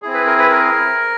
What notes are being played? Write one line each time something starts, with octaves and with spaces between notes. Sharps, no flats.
C4 E4 G#4
B4
A#4
B4
A#4